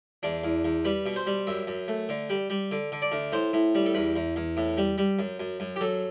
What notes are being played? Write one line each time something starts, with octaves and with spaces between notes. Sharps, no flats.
E2 D4
E2
E2
G3 B4
B2
C5
G3
F#2 E5
F#2
A3
D3
G3
G3
D3
D3
D5
D2
A2 C5
A2
G3
A4
E2 B4
E2
E2
A2
G3
G3
F#2
F#2
F#2
G4
F#3 A4